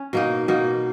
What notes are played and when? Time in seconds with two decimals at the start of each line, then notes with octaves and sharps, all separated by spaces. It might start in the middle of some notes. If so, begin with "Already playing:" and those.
Already playing: C#4
0.13 B2 A#3 D#4
0.48 B2 A#3 D#4